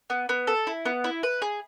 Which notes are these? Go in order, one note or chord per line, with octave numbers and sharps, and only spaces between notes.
B3
B3
A4
E4
B3
E4
B4
G#4